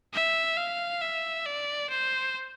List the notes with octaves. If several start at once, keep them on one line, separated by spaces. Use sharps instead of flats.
E5
F5
E5
D5
C5